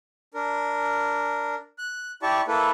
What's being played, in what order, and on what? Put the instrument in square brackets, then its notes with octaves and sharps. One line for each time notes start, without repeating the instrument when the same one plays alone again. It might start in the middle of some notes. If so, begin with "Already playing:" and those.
[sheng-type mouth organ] D4 A#4
F#6
E4 G4 D5 A5 C#6
A#3 E4 A4 B4